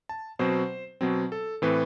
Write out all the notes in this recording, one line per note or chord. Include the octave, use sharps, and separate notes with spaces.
A5
B2 F#3 C4 C5
B2 F#3 C4
A4
A2 E3 A3 C4 B4